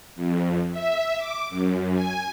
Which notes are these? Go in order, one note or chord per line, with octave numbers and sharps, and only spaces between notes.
F2
E5
D6
F#2
G#5